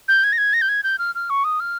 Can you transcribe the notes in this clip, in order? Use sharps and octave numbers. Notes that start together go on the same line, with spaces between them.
G6
G#6
A#6
G#6
A#6
G6
G#6
G6
F6
F6
C#6
D#6
F6